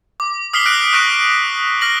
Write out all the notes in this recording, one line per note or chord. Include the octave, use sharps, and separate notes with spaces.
D6
D#6 F6 B6 C7 F#7 G7
F6 F#6 A#6 D7
C#6 F6 F#6 A#6 D7
F6 A#6 F#7